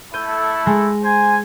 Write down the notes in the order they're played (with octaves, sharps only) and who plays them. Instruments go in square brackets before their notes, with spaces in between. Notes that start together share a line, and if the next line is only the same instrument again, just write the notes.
[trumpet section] A3 E4 A4 [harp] G6 G#6 D#7
[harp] G#3 A#6
[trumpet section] C5 G#5